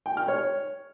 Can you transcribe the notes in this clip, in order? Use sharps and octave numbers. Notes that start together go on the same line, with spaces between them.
G5
F6
C#5